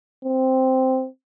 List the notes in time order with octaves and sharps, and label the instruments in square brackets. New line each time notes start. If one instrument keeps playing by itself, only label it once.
[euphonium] C4